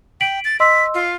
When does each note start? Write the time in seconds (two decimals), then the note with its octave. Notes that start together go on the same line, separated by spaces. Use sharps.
0.21 G5 B6 D7 F#7
0.45 A6
0.60 D#5 C6 E6 B6
0.95 F4